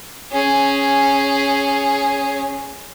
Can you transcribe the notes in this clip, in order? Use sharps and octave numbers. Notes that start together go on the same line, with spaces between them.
C#4 G#4